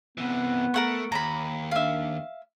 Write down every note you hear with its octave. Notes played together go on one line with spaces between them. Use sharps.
C3 E3 B3
A3 A#4 F#5 C#6
D#2 A#5 B5
D4 E5 F5